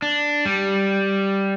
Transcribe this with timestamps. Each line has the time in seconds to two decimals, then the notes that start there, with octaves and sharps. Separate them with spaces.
0.02 D4
0.46 G3